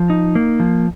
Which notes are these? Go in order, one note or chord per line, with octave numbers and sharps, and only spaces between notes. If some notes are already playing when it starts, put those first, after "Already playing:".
Already playing: F3
D#4
A#3
F3